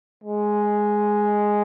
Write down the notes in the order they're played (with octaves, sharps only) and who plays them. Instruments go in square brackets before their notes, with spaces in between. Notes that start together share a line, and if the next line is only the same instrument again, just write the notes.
[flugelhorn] G#3